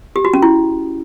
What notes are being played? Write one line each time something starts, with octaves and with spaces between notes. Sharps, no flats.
G4
F#4
C#4
E4